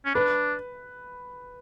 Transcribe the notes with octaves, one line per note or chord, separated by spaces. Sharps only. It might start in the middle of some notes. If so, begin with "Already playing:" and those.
C#4
D4 B4